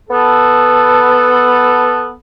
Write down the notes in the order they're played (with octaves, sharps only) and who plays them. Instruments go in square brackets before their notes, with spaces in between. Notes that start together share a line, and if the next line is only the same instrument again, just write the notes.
[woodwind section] B3 A4